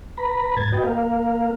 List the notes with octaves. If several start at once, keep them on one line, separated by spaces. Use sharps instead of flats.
B4 A#5 B5
G#2 G#6 A6
F#4 B4 D#5 G5
A#3 A#4 F5